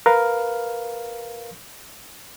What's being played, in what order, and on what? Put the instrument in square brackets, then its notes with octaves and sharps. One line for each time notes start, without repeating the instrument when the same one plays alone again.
[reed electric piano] A#4 B4 F5